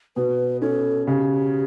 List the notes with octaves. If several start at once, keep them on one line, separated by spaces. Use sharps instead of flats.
B2 B4
C#4 A4
C#3 G4